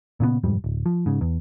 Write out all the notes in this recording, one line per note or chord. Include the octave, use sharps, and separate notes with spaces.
A#2 C#3 F3 B3
E1 F2 G#2 G3
D1
F3
G#2 C#3
E2